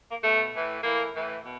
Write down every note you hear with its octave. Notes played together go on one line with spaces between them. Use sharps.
A#3
B2 A3
A2 E3
A2 E3 A#3
A2 E3
B2